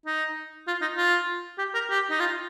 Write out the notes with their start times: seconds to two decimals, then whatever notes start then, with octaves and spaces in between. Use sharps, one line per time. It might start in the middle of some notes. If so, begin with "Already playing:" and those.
0.06 D#4
0.67 F4
0.82 D#4
0.97 F4
1.58 G4
1.74 A#4
1.90 G4
2.11 D#4
2.20 F4